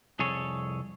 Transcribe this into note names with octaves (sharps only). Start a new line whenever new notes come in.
C2 F2 G#4 A4 C#5